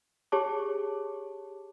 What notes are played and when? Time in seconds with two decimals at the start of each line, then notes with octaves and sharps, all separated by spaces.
0.32 G4 G#4 C#5 A5 D6